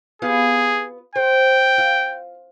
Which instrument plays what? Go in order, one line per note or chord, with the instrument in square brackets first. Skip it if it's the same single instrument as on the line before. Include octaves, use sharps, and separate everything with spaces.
[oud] B3 F4 G4 [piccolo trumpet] G#4
[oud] C5 [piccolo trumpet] G5
[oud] F4